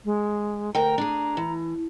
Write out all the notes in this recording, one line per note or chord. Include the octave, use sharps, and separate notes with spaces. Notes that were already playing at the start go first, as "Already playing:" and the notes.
G#3
D2 A#4 G5 A#5
D4 G#4
E3